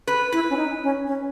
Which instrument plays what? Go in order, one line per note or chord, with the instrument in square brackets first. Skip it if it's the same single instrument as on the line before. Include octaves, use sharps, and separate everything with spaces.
[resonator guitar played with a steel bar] B4
[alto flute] E4 [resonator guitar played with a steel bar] B4
[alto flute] C#4
D#4
C#4
C#4